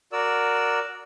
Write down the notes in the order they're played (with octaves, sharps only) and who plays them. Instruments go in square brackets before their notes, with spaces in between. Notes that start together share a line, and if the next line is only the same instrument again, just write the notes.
[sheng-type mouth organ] F#4 A#4 D5 E6